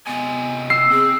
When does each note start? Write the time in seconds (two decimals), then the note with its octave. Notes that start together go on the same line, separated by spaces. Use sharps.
0.07 C3 B3 D#5 G#5
0.70 E6 C7
0.90 C4 G#4